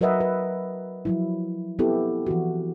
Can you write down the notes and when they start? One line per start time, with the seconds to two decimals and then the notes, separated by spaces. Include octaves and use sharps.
0.01 F#3 A#4 B4 D#5 E5 F#5
0.20 B4
1.05 F3 F#3 E4
1.79 B3 C4 E4 G4 A4
2.27 E3 F3 F#4